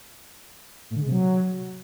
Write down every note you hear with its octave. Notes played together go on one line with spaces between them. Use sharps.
A2
D3
G#3
C3
F#3